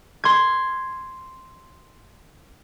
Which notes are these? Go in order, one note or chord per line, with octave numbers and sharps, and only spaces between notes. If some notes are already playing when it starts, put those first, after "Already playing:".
C6 G#6